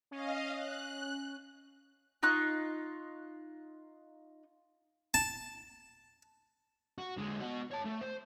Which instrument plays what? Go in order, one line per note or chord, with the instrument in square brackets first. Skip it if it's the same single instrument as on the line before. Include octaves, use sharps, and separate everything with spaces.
[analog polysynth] C#4 [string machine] D#5 F5
[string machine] F#6
[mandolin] D#4 F4 C#6 F#6
[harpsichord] A5
[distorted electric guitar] F#4
D3 G#3
B3 F#4
C#5 A5
A3
C5